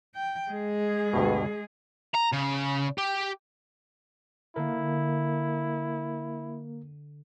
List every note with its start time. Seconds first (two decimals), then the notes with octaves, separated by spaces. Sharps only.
0.16 G5
0.51 G#3 G#4
1.13 D2 G2 B2
2.15 A#5
2.33 C#3
2.98 G4
4.56 D3 A#3 E4 A#4